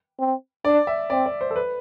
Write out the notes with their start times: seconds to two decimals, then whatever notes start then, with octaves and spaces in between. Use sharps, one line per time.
0.19 C4
0.65 D4 D5
0.87 E5
1.10 C4 D5
1.26 D5
1.41 C5
1.50 A4
1.56 B4